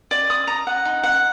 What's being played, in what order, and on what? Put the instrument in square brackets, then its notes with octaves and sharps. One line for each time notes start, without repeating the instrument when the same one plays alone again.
[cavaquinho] D5
D#6
A#5
F#5
D#4
F#5